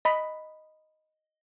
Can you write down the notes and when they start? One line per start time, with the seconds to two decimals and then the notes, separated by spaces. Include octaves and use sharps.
0.05 D#5 B5